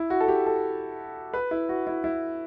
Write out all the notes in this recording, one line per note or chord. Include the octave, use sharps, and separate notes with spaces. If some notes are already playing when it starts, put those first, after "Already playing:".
Already playing: E4
F#4
A4
G4
A4
B4
E4
F#4
E4
E4